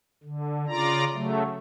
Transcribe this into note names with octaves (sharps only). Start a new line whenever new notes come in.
D3
C#3 F4 D5 A#5
C#3 F#3 A3